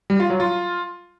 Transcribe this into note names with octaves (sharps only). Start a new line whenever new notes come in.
G3
F4
F#3
F4